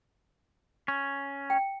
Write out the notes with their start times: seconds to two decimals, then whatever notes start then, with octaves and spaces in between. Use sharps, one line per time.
0.88 C#4
1.50 G5